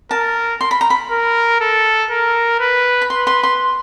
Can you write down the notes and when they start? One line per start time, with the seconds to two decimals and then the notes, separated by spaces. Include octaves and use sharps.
0.11 A#4 A5
0.61 C6
0.71 B5
0.81 A#5
0.90 B5
1.11 A#4
1.61 A4
2.11 A#4
2.60 B4
3.02 B5
3.10 B4 C6
3.27 C6
3.43 C6